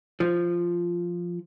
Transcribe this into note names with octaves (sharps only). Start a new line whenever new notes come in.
F3